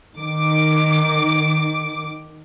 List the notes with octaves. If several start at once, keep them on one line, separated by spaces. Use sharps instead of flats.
D#3 D6